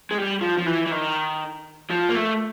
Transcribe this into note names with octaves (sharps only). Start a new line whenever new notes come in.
G#3
G3
F3
F3
E3
E3
D#3
F3
A#3
A3